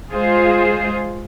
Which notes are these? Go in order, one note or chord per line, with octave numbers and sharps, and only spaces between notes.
G#3 F4 G#4 C5